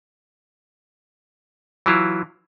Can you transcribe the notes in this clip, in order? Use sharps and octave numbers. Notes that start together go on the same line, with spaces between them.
E3 F#3 E4 F4